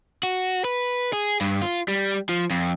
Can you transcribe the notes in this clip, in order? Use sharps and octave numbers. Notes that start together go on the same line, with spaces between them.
F#4
B4
G#4
G2
F4
G3
F3
F2